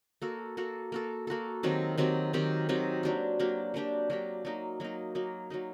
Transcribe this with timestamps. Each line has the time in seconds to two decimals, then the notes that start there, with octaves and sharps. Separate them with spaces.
0.22 A#3 F#4 A4
0.57 A#3 F#4 A4
0.92 A#3 F#4 A4
1.27 A#3 F#4 A4
1.63 D#3 F#3 C4 G4
1.98 D#3 F#3 C4 G4
2.33 D#3 F#3 C4 G4
2.69 D#3 F#3 C4 G4
3.03 F#3 A#3 D4 G4
3.40 F#3 A#3 D4 G4
3.74 F#3 A#3 D4 G4
4.10 F#3 A#3 D4 G4
4.45 F#3 A#3 D#4
4.80 F#3 A#3 D#4
5.15 F#3 A#3 D#4
5.50 F#3 A#3 D#4